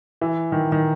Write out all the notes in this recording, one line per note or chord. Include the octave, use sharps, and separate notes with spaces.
E3
D#3
D#3